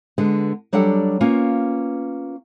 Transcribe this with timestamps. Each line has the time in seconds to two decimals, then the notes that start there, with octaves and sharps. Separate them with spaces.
0.18 D3 G#3 B3
0.73 F#3 G3 D4 G4 A4 F#5
1.21 A#3 B3 C#4 F4